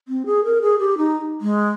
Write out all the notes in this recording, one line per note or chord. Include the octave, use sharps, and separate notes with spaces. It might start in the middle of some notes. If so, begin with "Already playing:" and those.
C4
G#4
A#4
G#4
G4
D#4
G#3